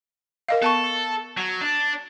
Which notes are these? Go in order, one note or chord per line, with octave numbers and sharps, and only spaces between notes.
A#4 D#5 F5
B3 A4 A5 C#6
F#3
D4